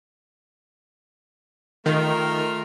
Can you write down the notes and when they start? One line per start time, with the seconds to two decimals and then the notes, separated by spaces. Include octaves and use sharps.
1.86 D#3 A3 F4 A#4